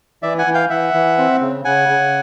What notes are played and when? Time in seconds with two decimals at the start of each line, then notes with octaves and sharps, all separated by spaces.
0.23 E3 D5 E5
0.38 F#5 G#5
0.46 E3
0.54 F5 G5
0.70 E3 E5 F#5
0.94 E3
1.18 C4
1.41 C#3
1.65 C#3 F#5 G#5
1.89 C#3